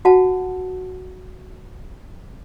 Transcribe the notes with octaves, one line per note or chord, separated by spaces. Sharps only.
F#4 F#5 A5